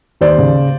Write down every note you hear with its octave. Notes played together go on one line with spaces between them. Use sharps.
D#2 C5 D5
C#3